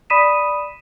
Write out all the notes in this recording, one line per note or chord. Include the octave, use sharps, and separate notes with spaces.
D5 B5 D#6 B6 D#7 E7